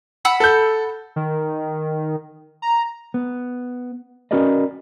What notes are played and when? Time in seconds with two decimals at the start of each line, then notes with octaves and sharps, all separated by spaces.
0.25 F#5 B5 E6
0.40 A4 G6
1.16 D#3
2.62 A#5
3.14 B3
4.31 C#4 F#4 A#4 B4 D5 D#5